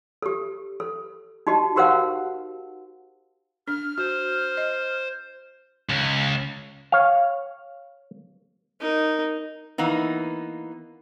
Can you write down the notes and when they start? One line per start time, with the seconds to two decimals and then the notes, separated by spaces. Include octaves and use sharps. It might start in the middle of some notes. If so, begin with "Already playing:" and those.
0.22 G4 A4
0.80 A4
1.47 D#4 F#4 G4 D#5 A5
1.76 F#4 G4 A#4 C5 F5 F#5
3.68 D4 F6
3.98 F#4 C5
4.57 D#5
5.89 C#2
6.92 C#5 F5
8.80 D#4 A#4
9.78 E3 A#3 B3 D#4